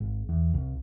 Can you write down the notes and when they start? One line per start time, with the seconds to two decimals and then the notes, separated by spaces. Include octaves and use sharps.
0.01 G#1
0.29 E2
0.54 C2